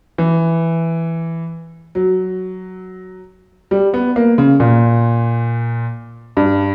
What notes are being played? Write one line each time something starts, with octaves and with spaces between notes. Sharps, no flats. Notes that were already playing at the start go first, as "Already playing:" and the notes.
E3
F#3
G3
B3
A#3
C#3
A#2
G2